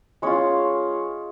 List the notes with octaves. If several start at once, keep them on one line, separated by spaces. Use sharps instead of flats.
G#3 C#4 F4 C#5